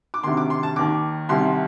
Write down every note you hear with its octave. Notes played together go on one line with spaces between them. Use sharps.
D6
D2 C3 D#3 C6
D6
C6
A5
D#2 D#3 D6
C2 C3 D#3 C6